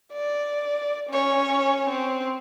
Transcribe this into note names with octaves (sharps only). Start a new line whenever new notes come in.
D5
C#4 C#5
C4